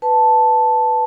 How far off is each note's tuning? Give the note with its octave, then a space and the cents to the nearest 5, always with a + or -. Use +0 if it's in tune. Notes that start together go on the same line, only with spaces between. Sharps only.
B4 +0 A5 +0